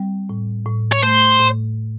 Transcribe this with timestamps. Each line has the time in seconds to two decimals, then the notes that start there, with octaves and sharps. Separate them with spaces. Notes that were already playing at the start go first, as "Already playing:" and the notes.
Already playing: G3 C4
0.29 A2
0.66 A2
0.92 C#5
1.03 A3 C5
1.40 A2